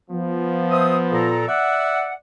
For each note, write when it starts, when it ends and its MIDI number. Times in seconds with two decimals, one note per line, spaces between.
0.11 1.52 53
0.11 1.52 59
0.71 0.97 72
0.71 0.97 76
0.71 0.97 87
1.12 1.48 46
1.12 1.48 69
1.12 1.48 82
1.48 2.14 74
1.48 2.14 76
1.48 2.14 78